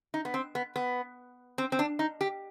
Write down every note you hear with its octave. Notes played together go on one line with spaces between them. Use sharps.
D#4
B3
C4
B3
B3
C4
C4
D4
D#4
G4